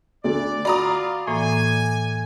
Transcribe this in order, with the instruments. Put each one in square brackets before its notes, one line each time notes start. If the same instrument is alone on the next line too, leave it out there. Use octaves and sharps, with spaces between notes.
[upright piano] D2 [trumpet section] D5
[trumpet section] F4 [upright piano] F#4 [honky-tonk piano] D5 A#5 D#6 [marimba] B5
[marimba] A2 E3 A#3 [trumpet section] G#5